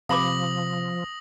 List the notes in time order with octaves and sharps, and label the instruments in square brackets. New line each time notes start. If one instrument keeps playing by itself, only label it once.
[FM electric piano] C3 [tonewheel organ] F3 [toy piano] F5 B5 D6 [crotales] D#6 A#6 F#7